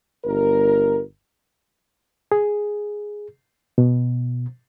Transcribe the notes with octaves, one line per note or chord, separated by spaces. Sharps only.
G1 A#4
G#4
B2